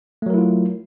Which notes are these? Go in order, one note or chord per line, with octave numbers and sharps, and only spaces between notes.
F#3 A3 E4 F4 A#4